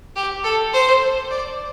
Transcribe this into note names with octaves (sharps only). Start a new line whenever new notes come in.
G4
A4
C5
D5